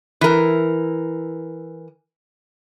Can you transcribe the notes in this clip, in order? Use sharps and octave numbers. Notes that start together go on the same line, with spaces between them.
E3 A#4